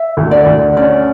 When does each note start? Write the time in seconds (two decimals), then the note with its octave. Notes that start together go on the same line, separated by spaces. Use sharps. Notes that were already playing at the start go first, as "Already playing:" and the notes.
Already playing: E5
0.17 D2
0.31 D5
0.46 D2
0.77 C#4 D5